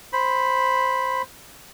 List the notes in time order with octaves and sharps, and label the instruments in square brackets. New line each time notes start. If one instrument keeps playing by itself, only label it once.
[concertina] C5 B5